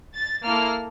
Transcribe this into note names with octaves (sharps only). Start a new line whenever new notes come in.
A6
A#3 E4 A4 F6